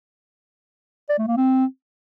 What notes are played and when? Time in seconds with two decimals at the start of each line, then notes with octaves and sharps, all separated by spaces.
1.09 D5
1.18 A3
1.28 A#3
1.37 C4